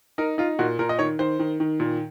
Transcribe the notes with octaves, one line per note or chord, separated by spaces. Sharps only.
D#4 A#4
D#4 F4
A#2 F#4
A#2 A#4
D#5
D#3 C#5
D#3 C5
D#3
D#3
A#2